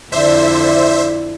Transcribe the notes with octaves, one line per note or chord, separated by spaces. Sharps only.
F2 D3 D4 E4 C5 E5